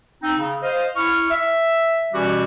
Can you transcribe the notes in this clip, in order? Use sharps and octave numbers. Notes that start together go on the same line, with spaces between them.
C4 D#4
C#3
C5 D#5 F5
E4 C#6 F6
E5
B2 E3 G3 C#4 F#4 G4